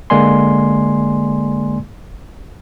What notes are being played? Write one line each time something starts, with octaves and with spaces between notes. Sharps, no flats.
D3 G#3 A#3 D5 G#5 C6